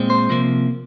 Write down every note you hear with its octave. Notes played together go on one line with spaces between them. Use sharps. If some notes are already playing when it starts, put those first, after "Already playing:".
Already playing: A#2 G#3 C4
C5
C3 F3 A#3